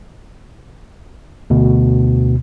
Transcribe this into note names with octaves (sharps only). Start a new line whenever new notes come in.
D2 B2